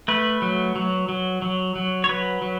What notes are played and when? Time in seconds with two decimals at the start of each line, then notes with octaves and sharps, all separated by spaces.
0.08 A3 B4
0.42 F#3
0.76 F#3
1.09 F#3
1.42 F#3
1.76 F#3
2.04 C#5
2.09 F#3 B4
2.42 F#3